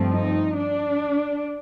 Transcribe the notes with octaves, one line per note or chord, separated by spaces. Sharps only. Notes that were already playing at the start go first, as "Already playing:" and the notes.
Already playing: G2 F3 A3 C4
D#4
D4